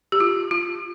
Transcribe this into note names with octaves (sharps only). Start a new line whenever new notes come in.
G4
F4
F4